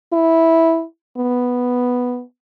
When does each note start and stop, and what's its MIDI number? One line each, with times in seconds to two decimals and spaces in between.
0.13 0.84 64
1.18 2.22 59